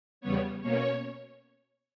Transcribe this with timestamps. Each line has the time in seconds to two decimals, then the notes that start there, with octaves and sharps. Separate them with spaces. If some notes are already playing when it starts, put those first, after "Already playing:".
0.21 E2 C#3 G3 B3 C#5
0.61 B2 A#3 C#4 C#5